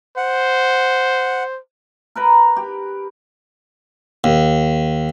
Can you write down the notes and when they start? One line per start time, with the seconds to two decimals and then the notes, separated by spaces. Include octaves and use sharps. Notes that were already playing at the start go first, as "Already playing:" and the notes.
0.17 C5 F#5
2.15 A#4 B4 A#5
2.56 G4
4.24 D#2